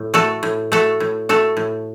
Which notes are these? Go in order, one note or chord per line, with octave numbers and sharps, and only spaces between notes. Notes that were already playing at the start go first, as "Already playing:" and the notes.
Already playing: A2
A3 F#4 A4
A2
A3 F#4 A4
A2
A3 F#4 A4
A2